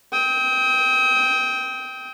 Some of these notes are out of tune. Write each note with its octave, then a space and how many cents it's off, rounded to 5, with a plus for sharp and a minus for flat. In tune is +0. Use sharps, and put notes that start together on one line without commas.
G5 +0 D#6 +45